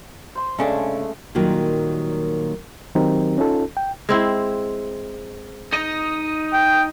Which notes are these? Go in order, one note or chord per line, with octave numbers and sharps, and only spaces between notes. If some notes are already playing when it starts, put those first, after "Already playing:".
C5 C6
C2 C#3 G#3 A3 C#4 D4
A#2 D#3 F#3 G3 A#3 F4
D#3 F#3 C4 D#4 G4 A#4
C#4 D#4 F4 A4
G5
G#3 C4 E4
D#4 D#5
G5